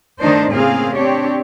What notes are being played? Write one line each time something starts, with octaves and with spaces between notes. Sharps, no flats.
D#3 A3 D4 D#4 C5
A2 C#3 A#3 C4 G#4 F5
C4 D4 G4 C#5